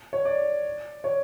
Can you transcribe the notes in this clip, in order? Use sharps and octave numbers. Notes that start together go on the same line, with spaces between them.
C#5
D5
C#5